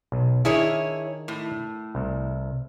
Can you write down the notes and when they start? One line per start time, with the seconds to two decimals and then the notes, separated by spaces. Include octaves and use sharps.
0.12 B1
0.45 D#3 D4 E4 G#4 A#4 C#5
1.28 A2
1.95 C2